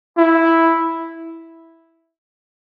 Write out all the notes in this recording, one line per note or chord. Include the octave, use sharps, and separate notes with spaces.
E4